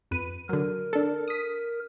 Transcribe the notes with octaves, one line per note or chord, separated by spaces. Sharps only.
F2 B4 D#7
D3 F#3 A#4
D4 A4
D#6 B6